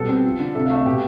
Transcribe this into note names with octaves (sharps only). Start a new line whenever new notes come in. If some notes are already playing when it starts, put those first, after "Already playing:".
Already playing: B2 G3 A4
C4
F3
D3
C3 A4
F5
A3
E5
B2 G4